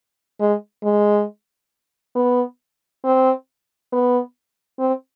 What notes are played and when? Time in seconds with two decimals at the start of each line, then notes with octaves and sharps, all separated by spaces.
0.40 G#3
0.84 G#3
2.16 B3
3.05 C4
3.93 B3
4.79 C4